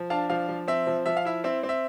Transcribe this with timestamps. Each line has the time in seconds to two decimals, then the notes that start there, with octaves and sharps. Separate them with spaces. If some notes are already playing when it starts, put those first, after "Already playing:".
Already playing: F3
0.10 D4 F5 A5
0.30 F3 F5
0.49 F3
0.68 C4 E5
0.87 F3
1.06 F3 E5
1.17 F5
1.25 E4 E5
1.44 C4 E5
1.63 C4
1.69 E5